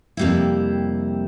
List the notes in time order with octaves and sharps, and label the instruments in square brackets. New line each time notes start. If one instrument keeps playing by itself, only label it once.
[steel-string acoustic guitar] F2 C3 G3 A#3 E4